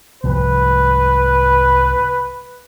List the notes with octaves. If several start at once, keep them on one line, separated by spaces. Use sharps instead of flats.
C2 G#2 F3 B4